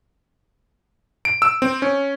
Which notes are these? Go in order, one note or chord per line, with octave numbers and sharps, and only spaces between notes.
D7
E6
C4
C#4